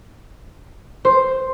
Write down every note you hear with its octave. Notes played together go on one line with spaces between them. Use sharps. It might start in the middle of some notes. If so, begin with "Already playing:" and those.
C5